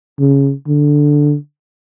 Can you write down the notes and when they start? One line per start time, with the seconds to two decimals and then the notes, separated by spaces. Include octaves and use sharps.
0.19 C#3
0.68 D3